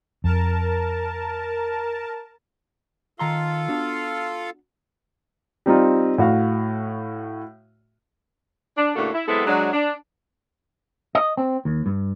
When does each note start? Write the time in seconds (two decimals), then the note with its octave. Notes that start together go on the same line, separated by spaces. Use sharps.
0.24 F2 A#4 A5
3.19 D#3 F4 A4 F5 A#5 C6
3.68 B3 D4 F#4
5.66 G3 C4 D#4 F4
6.18 A2 F#4 F5
8.77 D4
8.95 A2 C#3 A#3 D4 F#4 A4
9.13 E4
9.27 F#3 G#3 B3 C4 E4 A4
9.45 F#3 G#3 D4
9.72 D4
11.15 D#5
11.37 C4
11.65 D#2
11.86 G2